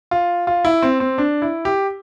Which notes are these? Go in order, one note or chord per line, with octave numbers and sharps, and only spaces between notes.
F4
F4
E4
C4
C4
D4
E4
G4